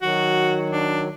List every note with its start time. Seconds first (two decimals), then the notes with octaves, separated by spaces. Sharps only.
0.02 D#3 F#3 F#4
0.70 D4